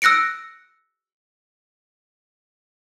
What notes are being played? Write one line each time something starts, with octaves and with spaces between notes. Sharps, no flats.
E6 F#6 A#6 C#7 D7